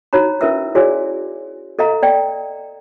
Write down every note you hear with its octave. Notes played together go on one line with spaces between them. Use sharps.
D#4 F#4 C#5 A#5 B5
C#4 E4 A#4 B4 E5 E6
E4 F#4 G#4 C#5 D5 G#5
A4 D#5 F5 A#5
D5 G5